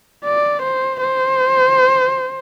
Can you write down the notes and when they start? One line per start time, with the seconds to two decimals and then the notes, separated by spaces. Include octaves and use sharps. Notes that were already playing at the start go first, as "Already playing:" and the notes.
0.25 D5
0.63 C5
1.01 C5